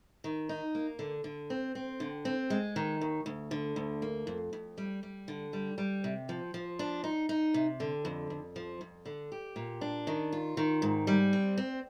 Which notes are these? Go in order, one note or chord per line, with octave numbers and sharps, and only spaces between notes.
D#3
D#4
A#3
D3
D3
C4
C4
D3
C4
G#3
D#3
D#2
D2
D3
D2
A#3
F2
F2
G3
G3
D3
G3
G3
C3
F3
F3
D4
D#4
D#4
C3
D3
F2
F2
F3
F2
D3
G4
A#2
D4
D#3
F4
D#3
G#2
G3
C4
C4